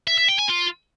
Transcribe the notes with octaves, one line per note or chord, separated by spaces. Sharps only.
E5
E5
G5
G#5
F4